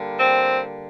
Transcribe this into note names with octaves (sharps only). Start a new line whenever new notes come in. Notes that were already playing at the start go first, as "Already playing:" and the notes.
Already playing: D3 G3 A#3
C4